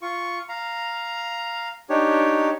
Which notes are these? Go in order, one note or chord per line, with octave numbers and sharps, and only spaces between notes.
F4 C#6
F5 A#5
D4 D#4 G4 C#5